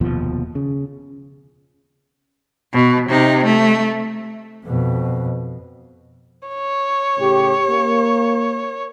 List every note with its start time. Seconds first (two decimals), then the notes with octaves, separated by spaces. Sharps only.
0.01 F1 D#2 B2 F3
0.55 C#3
2.73 B2
3.09 C3 D#4
3.44 A3
4.66 F2 B2
6.49 C#5
7.18 A2 C#3 G4
7.68 A#3